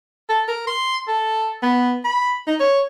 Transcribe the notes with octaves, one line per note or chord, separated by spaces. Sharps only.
A4
A#4
C6
A4
B3
B5
D#4
C#5